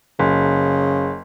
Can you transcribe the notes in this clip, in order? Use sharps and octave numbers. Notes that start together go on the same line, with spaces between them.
F#1 C#3